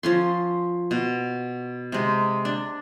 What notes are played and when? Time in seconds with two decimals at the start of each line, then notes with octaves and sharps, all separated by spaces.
0.03 F3 C#4 C6
0.91 B2
1.92 C3 G#3
2.45 D4